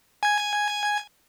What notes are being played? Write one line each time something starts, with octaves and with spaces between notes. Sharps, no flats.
G#5 G#6